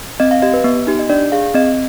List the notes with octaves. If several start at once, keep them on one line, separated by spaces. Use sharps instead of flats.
C4 D#5
F5
G4 D#5
B4
B3
D#4 G4
D#5
D4 D5
G#4 F5
C4 D#5